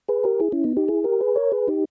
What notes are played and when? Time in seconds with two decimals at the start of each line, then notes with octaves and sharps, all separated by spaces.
0.08 G#4 B4
0.24 G4 A#4
0.40 E4 G#4
0.52 C#4 E4
0.64 B3 D#4
0.77 D#4 G4
0.88 E4 G#4
1.04 G4 A#4
1.21 G#4 B4
1.36 A#4 C#5
1.52 G#4 B4
1.67 D#4 G4